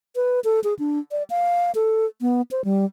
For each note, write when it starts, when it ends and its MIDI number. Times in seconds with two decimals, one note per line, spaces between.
0.16 0.40 71
0.44 0.60 69
0.64 0.74 68
0.79 0.99 62
1.11 1.23 74
1.30 1.72 77
1.75 2.06 69
2.21 2.42 59
2.51 2.61 72
2.65 2.85 55